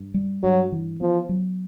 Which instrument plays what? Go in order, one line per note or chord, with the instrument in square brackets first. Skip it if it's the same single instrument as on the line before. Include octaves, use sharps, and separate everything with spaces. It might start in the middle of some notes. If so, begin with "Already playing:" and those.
Already playing: [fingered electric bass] G2
G3
[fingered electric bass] G2 [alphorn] F#3
[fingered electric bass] E3
[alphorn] F3 [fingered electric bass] B3
[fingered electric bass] F#3